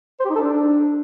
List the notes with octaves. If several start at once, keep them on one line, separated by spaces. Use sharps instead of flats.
C5
G4
D#4
A4
D4